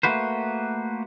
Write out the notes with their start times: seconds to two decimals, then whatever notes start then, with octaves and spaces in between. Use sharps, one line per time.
0.03 A3 A#3 F#4 B4 C5